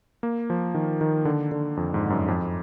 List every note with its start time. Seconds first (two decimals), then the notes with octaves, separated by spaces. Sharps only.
0.23 A#3
0.50 F3
0.74 D#3
1.01 D#3
1.25 D3
1.52 D3
1.77 F2
1.94 G#2
2.10 F#2
2.28 F2